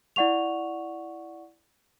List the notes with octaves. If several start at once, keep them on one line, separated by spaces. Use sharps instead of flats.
E4 D5 F#5 C#6 F7